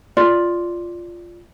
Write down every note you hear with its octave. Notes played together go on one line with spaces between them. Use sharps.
F4 D5